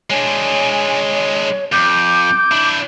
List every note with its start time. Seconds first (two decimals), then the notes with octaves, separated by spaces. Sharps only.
0.10 G#3 D4 C#5 G#5
1.72 F2 D6 G6
2.52 D4 E4